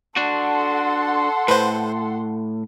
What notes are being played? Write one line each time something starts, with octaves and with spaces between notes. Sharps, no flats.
D4 F#4 A4 F#5 C6
A2 B4 C5